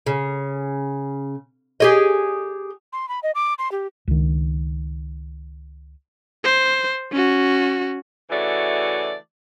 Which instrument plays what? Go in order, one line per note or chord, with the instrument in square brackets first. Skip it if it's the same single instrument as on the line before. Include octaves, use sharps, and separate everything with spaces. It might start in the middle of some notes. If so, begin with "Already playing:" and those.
[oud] C#3
G4 G#4 D#5
[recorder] C6
B5
D#5
D6
C6
G4
[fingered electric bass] C#2 D#3
[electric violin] C5
C#4 F#4
[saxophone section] C#3 E3 A3 F#4 D5